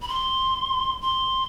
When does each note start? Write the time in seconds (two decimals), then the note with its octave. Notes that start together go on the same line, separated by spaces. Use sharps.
0.02 B5
0.08 C6
1.02 C6